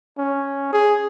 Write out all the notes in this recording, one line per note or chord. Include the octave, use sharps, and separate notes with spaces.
C#4
G#4